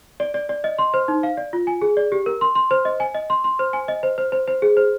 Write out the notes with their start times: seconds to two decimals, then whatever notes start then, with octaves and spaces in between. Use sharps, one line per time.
0.20 D5
0.34 D5
0.49 D5
0.64 D#5
0.78 C6
0.94 C5
1.08 D#4
1.23 F5
1.37 D5
1.53 F4
1.67 G#5
1.82 G#4
1.97 D5
2.12 G4
2.26 A#4
2.41 C6
2.55 C6
2.71 C5
2.85 D#5
3.00 G#5
3.15 D#5
3.30 C6
3.44 C6
3.59 C5
3.73 G#5
3.88 D#5
4.03 C5
4.18 C5
4.32 C5
4.48 C5
4.62 G#4
4.77 C5